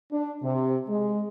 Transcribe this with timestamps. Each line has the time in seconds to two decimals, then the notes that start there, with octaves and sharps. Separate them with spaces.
0.11 D4
0.42 C3
0.88 G#3